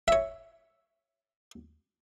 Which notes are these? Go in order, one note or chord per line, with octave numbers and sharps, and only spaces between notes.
C#5 E5